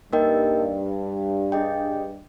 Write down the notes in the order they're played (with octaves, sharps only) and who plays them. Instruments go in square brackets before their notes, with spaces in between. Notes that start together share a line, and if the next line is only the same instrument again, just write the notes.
[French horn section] G2 [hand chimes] A#3 D#4 A#4 D#5 G5
[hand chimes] D4 G#4 D#5 G5